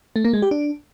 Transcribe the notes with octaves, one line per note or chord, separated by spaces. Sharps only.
A3
A#3
G#3
G4
D4